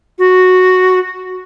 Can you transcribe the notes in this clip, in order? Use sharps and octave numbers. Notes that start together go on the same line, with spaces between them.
F#4